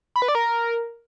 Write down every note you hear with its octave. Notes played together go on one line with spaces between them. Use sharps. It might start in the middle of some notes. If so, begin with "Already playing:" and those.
B5
B4
D5
A#4